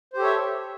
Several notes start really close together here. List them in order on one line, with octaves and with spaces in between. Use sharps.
C5 G4 A4 C#5 E5